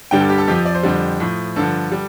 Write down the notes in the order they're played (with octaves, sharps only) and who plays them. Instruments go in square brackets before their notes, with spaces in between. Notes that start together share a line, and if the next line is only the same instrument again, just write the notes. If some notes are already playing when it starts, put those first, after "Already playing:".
[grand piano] G2 D3 G3 G5
A4
G4
A4
F2 F3 G4
D5
C5
F2 D3 G3
A2 F3
G2 D3 F3 A4
G3